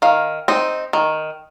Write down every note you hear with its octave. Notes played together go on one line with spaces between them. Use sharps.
D#3 F5
C4 D#4
D#3